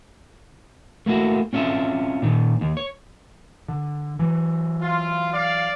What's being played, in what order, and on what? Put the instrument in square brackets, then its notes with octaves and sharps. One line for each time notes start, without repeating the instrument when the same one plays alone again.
[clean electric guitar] A3 A#3 E4 F#4
C4 C#4 F4 E5
A#2 D#3
D#2
C#5
[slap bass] D3
E3 F#3
[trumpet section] F4
D5 F5